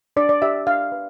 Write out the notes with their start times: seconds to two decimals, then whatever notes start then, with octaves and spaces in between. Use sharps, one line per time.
0.16 D4 D5
0.29 D5
0.42 G4 E5
0.67 D4 F5
0.92 B4